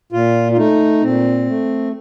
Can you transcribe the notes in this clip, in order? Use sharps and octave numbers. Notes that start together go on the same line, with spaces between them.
A#2 F4
F4
A3 D#4
A#2 C4
A3